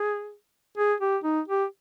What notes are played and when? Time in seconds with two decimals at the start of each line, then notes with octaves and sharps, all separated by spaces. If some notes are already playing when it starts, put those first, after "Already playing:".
Already playing: G#4
0.77 G#4
1.00 G4
1.24 D#4
1.48 G4